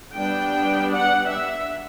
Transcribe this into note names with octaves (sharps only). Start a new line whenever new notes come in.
G3 B3 D4 G5
F#5
E5